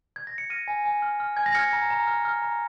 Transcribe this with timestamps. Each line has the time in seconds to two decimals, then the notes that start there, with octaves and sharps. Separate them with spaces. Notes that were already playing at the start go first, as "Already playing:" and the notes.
0.16 G#6
0.27 A#6
0.38 C#7
0.50 F6 A#6 D#7
0.68 G#5
0.85 G#5
1.02 F6
1.20 F6
1.37 G#5 G#6
1.46 A#6
1.55 F6 G#6 C#7
1.73 A#5
1.90 A#5
2.07 F6
2.25 F6
2.42 A#5